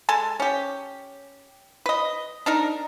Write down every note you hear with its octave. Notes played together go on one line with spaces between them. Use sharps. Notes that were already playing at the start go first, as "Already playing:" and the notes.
G#3 A4 G#5 A5
C#4 G4
B4 D#5
D4 D#4 A#4